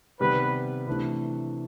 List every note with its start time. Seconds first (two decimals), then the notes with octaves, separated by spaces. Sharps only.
0.20 C3 D#3 G3 B3 B4
0.87 C3 E3 A3 D4 B4